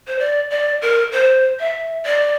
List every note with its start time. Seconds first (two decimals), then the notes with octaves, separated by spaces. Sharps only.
0.08 C5
0.19 D5
0.50 D5
0.82 A#4
1.12 C5
1.60 E5
2.05 D5